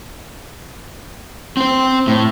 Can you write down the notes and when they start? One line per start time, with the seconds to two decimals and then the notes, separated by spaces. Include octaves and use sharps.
1.57 C4 C5
2.07 A2